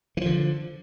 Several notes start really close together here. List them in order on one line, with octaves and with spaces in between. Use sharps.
E3 F3 D3